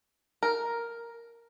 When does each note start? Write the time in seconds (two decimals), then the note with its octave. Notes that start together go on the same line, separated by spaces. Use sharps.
0.43 A#4